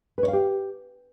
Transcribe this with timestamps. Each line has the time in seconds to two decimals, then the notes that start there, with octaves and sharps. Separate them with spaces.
0.18 B4
0.23 C#5
0.28 F5
0.33 G4